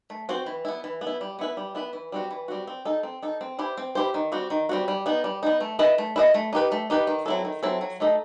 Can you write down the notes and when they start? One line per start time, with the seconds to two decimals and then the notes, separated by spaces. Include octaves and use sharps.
0.10 A3
0.29 C4 F#4 C5
0.46 E3
0.65 B3 E4
0.84 E3
1.01 B3
1.07 E4
1.21 G3
1.39 B3 E4 B4
1.57 G3
1.75 B3 E4 B4
1.93 E3
2.12 G3 C4 F#4
2.31 E3
2.48 G3 C4 F#4
2.67 C4
2.85 D#4 A4
3.03 C4
3.22 D#4 A4
3.41 C4
3.59 E4 G4 C5
3.78 C4
3.95 E4 G4 C5
4.14 D#3
4.32 G3 C4 F#4
4.50 D#3
4.69 G3 C4 F#4
4.88 G3
5.06 B3 D#4
5.24 G3
5.43 B3 D#4
5.61 A3
5.79 E4 B4 D#5
5.98 A3
6.16 E4 B4 D#5
6.34 A3
6.53 D#4 G4 B4
6.72 A3
6.90 D#4 G4 B4
7.07 D#3
7.26 F#3 C4 E4 A4
7.45 D#3
7.63 F#3 C4 E4 A4
7.81 F#3
8.00 A3 D#4 A4 D#5